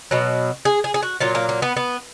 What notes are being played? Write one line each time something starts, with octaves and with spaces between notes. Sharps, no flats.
B2 F#3
G#4
G#4
G#4
F#4
A#2 F#3 F4
A#3
A#3
B3
B3